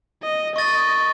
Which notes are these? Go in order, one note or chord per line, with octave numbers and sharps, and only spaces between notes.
D#5
D#5 C#6 A6